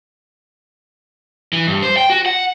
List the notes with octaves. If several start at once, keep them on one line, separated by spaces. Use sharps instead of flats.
E3
G2
C5
G5
F#4
F#5